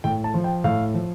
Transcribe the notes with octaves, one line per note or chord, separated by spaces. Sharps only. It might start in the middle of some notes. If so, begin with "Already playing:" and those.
A2 G5
A5
F3
G5
A2 F5
F3